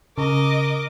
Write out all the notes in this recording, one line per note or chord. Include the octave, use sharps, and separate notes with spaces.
C#3 A#4 D#5 D6